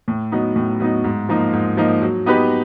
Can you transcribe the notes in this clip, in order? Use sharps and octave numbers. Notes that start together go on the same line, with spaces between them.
A2
F#3 B3 D#4
A2
F#3 B3 D#4
G#2
F3 A#3 D#4
G#2
F3 A#3 D#4
F#3
B3 D#4 G4 B4